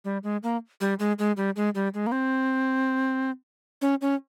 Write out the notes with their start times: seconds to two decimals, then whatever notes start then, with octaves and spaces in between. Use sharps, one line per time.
0.05 G3
0.24 G#3
0.43 A#3
0.81 G3
0.99 G#3
1.19 G#3
1.37 G3
1.56 G#3
1.75 G3
1.94 G#3
2.07 A#3
2.12 C4
3.82 C#4
4.01 C#4